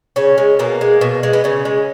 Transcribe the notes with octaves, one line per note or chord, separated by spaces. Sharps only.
C#3 C#4
G#3
B2 A#3
G#3
B2
G#3
B3
C#3 C#4
G#3